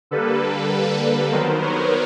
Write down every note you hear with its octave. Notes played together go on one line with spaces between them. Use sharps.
D3 G3 A#3 A4 B4
D#3 F#3 B3 A#4 C5
B4 C#5